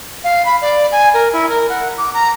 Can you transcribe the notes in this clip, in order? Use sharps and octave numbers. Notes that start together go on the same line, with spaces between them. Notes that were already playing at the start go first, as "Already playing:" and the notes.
F5
B5
D5
G#5
A#4
E4
A#4
F#5
D6
A#5